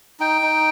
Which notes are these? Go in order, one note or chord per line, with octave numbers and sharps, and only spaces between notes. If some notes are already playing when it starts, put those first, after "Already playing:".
D#4 G5
D#4